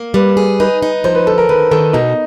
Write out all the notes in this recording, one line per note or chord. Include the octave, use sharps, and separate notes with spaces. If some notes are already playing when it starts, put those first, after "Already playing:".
Already playing: A#3
G3 B4
G#4
D#4 B4
D#4
F3 C5
B4
D3 A4
A#4
D#3 B4
D#3 A4
B2 D#4